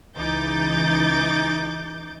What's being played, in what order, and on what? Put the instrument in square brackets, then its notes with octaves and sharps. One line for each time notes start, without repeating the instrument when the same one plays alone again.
[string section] C#2 E3 D#4 D6 G6 A6